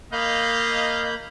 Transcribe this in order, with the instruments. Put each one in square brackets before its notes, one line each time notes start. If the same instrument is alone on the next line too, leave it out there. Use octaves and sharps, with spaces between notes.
[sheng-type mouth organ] A#3 B5 G6 [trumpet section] D#5 F5